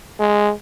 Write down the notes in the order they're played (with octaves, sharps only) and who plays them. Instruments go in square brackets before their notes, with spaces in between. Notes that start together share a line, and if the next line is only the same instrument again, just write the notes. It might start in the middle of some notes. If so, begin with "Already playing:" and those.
[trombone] G#3